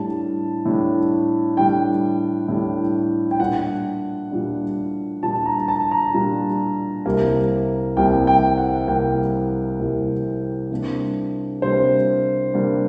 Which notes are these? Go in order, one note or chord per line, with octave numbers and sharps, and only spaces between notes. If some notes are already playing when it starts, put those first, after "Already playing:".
Already playing: A2 G3 D4 A5
A2 G3 D4
A2 G3 D4 G5
A2 G3 D4
G5
A#2 G3 D4 F#5
A#2 G3 D4
A#2 G3 D4 A5
A#5
A5
A#5
A#2 G3 D4
C2 C3 G3 A#3
C2 C3 G3 A#3 G5
G5
F#5
C2 C3 G3 A#3 G5
C2 C3 G3 A#3
C3 G3 A#3 D4
C3 G3 A#3 D4 C5
C3 G3 A#3 D4